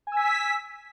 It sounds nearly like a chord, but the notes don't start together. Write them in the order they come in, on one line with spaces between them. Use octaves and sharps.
G#5 E6 B6